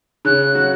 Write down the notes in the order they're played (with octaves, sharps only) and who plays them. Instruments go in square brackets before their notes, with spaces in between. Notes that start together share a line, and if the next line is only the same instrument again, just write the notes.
[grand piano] C#3 C#4 [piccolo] F#6
[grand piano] F#3 F#4